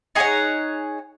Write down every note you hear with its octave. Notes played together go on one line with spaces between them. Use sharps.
D#4 G#4 C#5 F#5